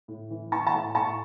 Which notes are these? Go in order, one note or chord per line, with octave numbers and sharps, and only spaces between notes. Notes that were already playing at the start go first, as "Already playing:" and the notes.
A2
E3
E3 A5 C#6
F#5 A5
A2
A2 A5 C#6